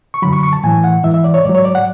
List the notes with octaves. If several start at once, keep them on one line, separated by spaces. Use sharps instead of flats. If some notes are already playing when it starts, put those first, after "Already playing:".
C#6
F#2 D3 F#3 B5
C#6
C#6
A5
A2 E3 G#5
F#5
G#2 E3 E5
E5
D5
C#5
G#2 F#3 D5
C#5
D5
F#5